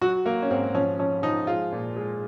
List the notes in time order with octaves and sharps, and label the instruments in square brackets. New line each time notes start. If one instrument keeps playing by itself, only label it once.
[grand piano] F#3 F#4
F#3 A#3
C#4
G#2 C4
F3 C#4
F3 C#4
F3 D#4
G#3 F4
A#2
G#3